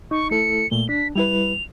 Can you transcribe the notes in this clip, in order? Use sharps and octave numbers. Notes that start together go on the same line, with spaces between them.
D#4 C#6
A3 E4 A4 C#7
A#2 A3 G7
D4 B6
G3 E4 B4 F7